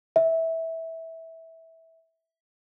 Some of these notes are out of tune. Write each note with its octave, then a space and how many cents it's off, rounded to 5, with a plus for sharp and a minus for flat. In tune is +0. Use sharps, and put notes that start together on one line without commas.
E5 -15